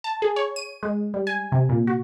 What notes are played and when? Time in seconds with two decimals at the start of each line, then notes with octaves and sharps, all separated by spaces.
0.04 A5
0.22 G#4
0.36 C#5
0.56 D#7
0.83 G#3
1.14 G3
1.27 G#5
1.52 C3
1.69 A#2
1.87 F#4